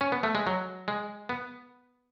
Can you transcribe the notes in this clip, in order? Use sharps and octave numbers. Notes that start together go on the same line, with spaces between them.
C#4
B3
A3
G#3
F#3
G#3
B3